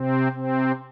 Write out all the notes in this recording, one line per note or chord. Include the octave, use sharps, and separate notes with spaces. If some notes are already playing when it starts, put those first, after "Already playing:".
Already playing: C3 C4
C3 C4